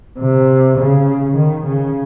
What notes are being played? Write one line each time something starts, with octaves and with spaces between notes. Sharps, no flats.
C3
C#3
D#3
C#3